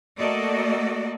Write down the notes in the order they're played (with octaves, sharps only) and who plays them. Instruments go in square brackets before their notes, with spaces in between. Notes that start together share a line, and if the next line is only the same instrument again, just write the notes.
[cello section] A3 A#3 F#4 A4 D5 D#5